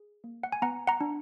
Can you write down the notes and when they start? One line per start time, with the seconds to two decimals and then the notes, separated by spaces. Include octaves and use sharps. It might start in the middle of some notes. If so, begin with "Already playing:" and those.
Already playing: G#4
0.24 A#3
0.43 F#5
0.52 G#5
0.62 B3 F#5 A#5
0.87 F#5 A#5
1.01 D4